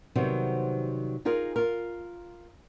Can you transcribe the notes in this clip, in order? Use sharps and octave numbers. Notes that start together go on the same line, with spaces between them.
C3 D#3 F#3 G3 B3 C4
D#4 F4 G#4 A#4
F4 A#4